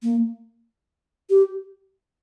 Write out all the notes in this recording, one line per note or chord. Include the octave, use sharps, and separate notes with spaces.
A#3
G4